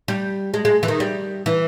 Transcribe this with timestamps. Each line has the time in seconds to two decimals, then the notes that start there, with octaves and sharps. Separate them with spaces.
0.08 G3
0.54 G#3
0.65 G#3
0.83 E3
0.88 D#3
1.00 G3
1.46 E3